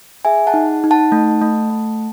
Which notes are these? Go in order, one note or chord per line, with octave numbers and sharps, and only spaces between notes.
G#4 E5 G#5
F#5 A5
D#4
D#4
F#5 A5
A3
A3
A3